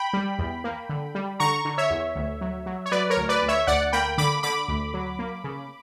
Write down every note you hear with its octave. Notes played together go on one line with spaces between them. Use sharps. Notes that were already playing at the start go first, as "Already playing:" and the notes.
Already playing: G5 B5
G3
E2
A#3
D3
G3
D3 A#5 C#6
D3
C#5 E5
E2
D2
F#3
F#3
C#5
F#3 B4 D5
A#4 C#5
D2
B4 D5
D2
C#5 E5
D2 D5 F#5
A#3 G5 B5
D3 B5 D6
D3 B5 D6
D2
F#3
A#3
C#3